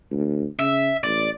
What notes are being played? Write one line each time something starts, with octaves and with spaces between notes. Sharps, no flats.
D2
C#3 E5
A1 D5